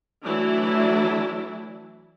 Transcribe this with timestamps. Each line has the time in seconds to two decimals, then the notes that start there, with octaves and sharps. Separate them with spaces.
0.24 E3 F#3 A3 D4 E4